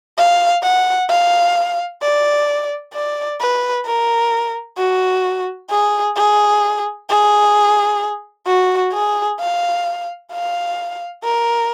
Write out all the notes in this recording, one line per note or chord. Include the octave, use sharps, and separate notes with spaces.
F5
F#5
F5
D5
D5
B4
A#4
F#4
G#4
G#4
G#4
F#4
G#4
F5
F5
A#4